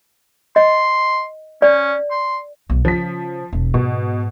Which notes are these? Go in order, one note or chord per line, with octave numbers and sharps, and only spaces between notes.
D#5 C6
C#4 D5
C6
B1
C#3 F3 B6
E1
G#2 B2